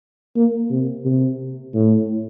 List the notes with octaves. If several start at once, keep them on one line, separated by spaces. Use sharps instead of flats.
A#3
C3
C3
A2